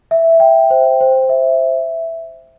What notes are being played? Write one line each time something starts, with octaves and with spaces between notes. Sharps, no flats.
E5
G5
C5
C5
E5